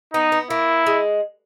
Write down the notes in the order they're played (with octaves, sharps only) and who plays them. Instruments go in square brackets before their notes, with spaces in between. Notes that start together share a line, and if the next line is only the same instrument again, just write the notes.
[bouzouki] B3 [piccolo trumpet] D#4
[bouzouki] B3
[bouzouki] A#3 [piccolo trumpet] E4
[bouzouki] G#3